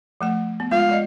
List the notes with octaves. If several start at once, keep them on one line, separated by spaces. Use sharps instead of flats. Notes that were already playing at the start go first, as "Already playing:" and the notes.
F3 A3 F#5
B3
G#3 F4 F5
G#3 D5 D#5